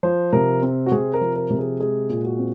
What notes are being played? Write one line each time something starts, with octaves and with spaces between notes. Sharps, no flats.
F3 C5
C3 A#4
C4
F#4
C3 G#4
A#4
F3
A#4
C3
G#4
G#3 G#4
A#2
F#4
C4